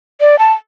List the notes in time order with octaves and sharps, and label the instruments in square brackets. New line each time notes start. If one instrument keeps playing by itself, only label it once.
[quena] D5
A5